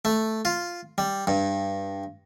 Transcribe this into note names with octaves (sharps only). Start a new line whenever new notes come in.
A3
F4
G3
G2